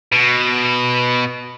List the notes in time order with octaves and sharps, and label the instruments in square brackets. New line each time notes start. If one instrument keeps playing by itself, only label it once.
[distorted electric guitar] B2